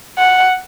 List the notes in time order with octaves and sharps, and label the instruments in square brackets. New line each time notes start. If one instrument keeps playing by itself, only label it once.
[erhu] F#5